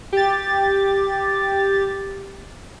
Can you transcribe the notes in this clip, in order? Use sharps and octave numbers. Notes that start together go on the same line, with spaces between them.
G4 A6